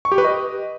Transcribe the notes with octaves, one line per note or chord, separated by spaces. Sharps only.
C#6
G4
B4
D#5